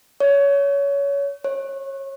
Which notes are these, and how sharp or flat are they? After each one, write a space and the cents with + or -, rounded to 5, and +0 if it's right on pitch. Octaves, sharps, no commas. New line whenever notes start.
C#5 +20
C#5 -30